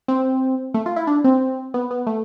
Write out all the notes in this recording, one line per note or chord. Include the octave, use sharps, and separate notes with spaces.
C4
A3
F4
E4
D4
C4
B3
B3
A3